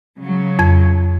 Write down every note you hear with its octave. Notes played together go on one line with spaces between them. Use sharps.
C#3 F#3
F2 G#6